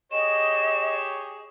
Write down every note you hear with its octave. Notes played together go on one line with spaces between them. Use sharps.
G4 G#4 C#5 D#5 E7